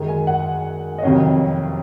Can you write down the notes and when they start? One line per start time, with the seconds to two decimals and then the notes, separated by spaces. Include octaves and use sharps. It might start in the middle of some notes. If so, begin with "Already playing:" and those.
Already playing: F#2 D#3 G#3
0.08 G#5
0.27 F#5
0.98 D#5
1.02 F2 C3 D#3 F#3 C#4 F5